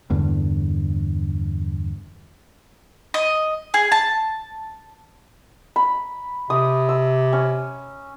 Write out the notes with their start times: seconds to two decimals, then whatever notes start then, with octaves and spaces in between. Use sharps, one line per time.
0.10 E2 G2 D3
3.14 D#5
3.74 G#4
3.92 A5
5.76 B5
6.50 C3 D#6
6.89 E6
7.33 C#4